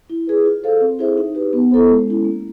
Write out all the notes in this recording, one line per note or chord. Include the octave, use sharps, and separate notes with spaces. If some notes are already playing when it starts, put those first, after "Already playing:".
E4
G#4 B4
F4
A4 C5 F5
C4
E4 G#4 C5 E5
D#4
G4 B4
B3
E4 A4 C5
G#3
C#4 E4
A#3